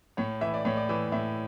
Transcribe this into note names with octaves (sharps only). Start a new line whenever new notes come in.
A2 C#5
E3 E5
D5
A2 C#5
D5
E3
A2 E5